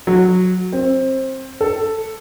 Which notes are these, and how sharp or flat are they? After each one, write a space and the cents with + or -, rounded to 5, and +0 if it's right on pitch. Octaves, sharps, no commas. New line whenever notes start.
F#3 -15
C4 +20
A4 +5